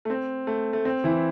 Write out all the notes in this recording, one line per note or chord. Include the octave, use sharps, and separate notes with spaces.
A3
C4
A3
A3
C4
E3 E4